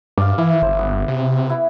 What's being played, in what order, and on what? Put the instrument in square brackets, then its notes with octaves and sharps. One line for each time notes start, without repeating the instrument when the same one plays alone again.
[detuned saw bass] G2 [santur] D5 F5
[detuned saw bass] E3 [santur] E4
[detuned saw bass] G1 [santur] C5
[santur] B3
[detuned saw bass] C3
[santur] E4 B4